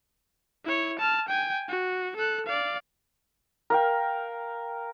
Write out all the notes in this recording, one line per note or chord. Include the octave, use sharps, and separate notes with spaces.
E4 C#5
A5 F6
G5 G#5
F#4
A4 F#6
D5 F5
A#4 F5 G5